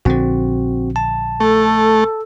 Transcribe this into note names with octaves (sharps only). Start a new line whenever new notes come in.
A#1 D3 C4 F#4
A5
A3 A4